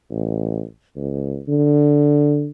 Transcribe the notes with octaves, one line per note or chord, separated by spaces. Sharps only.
A1
C#2
D3